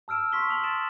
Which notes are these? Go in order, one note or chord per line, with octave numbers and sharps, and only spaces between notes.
A5 E6 F6 D7 E7
C6 C#6 B6 G7
A5 D#6 F7 F#7
C6 A6 D7 E7